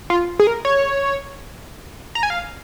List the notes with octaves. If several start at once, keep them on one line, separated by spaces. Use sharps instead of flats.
F4
G#4
A#4
C#5
A#5
G#5
F5